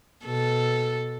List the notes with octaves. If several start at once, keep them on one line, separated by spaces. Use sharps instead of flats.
B2 A4